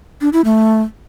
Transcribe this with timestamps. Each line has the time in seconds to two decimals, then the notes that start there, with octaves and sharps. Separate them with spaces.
0.21 D4
0.33 E4
0.45 A3